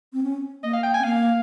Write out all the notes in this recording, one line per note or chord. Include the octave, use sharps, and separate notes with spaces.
C4
C#4
A#3 D#5
F5
G5
C4 G#5
A#3 F5